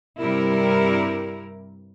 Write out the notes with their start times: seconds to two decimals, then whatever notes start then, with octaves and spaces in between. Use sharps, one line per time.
0.20 G2 C3 G3 E4 A#4